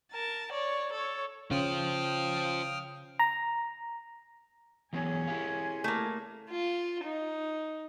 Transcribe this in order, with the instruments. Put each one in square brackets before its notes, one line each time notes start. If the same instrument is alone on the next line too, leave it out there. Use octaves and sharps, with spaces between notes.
[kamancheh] A#4 A5
C#5 D5
A4 C#5
[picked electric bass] C#3 [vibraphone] C#4 C#5 [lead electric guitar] F4 C5 [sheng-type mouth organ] G5 D#6 F6
[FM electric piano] A#5
[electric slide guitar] E3 F#3 B3 [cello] C#4 G#4
[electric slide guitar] E4 G4 F5
[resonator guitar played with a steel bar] A3 A#3
[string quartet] F4
D#4